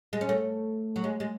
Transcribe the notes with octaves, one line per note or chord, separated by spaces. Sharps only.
G#3
C#4
A3
F#3
G#3
G#3